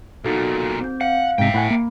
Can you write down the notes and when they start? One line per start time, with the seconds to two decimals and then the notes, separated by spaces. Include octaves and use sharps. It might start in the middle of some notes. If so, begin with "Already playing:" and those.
0.24 B1 A#2 D#4 F#4 A4
0.80 C4 G6
1.01 F5 F#5
1.38 G#2 C3 E5 G5
1.54 A2 F#5 G#5 B5
1.71 A#3